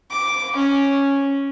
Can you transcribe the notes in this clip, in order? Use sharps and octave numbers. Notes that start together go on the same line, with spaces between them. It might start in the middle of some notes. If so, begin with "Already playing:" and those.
D6
C#4